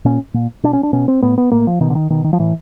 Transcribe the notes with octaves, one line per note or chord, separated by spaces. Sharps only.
A#2 C#4
A#2
B2 D4
C#4
D4
B2 C#4
C4
A2 B3
B3
A2 A#3
F3
B2 D#3
D3
D#3
B2 D#3
D#3
F3
A2 E3